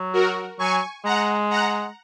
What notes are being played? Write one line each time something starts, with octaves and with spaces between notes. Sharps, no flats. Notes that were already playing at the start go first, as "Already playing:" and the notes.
Already playing: F#3
F#4 A#4
F#3 G#5 C#6
G#3 F#5 A#5
F#5 A#5